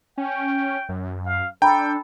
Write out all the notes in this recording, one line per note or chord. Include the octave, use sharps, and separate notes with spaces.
C#4 G5
F#2
F5
D4 A4 G5 A#5 B5